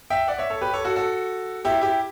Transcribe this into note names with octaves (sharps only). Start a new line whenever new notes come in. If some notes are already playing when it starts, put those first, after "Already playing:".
E5 G5
D5 F#5
C#5 E5
A4 C#5
G4 B4
A4 C#5
F#4 A4
F#4 A4
E4 G4
E4 G4